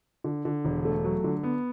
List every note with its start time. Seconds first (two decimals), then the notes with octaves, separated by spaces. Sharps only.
0.24 D3
0.45 D3
0.65 E1
0.85 A3
1.05 F#3
1.24 D3
1.43 B3